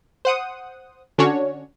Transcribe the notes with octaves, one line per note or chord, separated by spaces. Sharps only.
C5 F#5 D#6
D3 C#4 D4 F#4 C#5